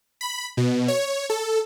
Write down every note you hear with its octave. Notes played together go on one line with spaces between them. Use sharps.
B5
B2
C#5
A4